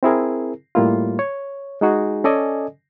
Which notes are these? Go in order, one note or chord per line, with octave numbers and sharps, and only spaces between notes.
C4 E4 G#4 A#4
A2 G3 A#3 E4 F4
C#5
G#3 D#4 F#4 G#4
C#4 A4 D5 D#5 G#5